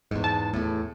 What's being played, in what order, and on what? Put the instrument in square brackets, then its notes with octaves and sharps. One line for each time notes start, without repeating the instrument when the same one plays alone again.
[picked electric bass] E2 G#2
[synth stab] A5
[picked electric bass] E2 A2